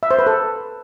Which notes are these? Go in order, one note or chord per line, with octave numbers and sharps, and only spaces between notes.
E5
C5
B4
A4